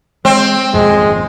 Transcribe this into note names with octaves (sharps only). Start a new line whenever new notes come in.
G#3 C4
D#1 G#1 F2 G#3